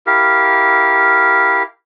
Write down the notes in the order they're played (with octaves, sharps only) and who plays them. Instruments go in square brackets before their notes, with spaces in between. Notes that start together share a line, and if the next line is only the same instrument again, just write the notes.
[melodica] E4 G4 A#4 F5